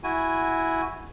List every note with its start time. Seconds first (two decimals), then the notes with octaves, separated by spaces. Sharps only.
0.04 E4 F#4 G#5